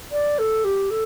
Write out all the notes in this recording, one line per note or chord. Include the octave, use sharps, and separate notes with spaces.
D5
A4
G4
A4